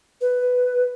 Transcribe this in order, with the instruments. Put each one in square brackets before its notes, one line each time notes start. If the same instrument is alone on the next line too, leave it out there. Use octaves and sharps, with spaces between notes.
[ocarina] B4